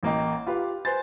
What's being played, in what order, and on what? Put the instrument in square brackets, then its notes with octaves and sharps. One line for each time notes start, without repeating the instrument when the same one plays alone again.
[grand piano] A1 A#3 D#5 G5
F4 G4 B4 F5
B4 C5 G#5 A6